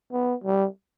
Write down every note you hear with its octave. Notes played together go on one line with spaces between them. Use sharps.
B3
G3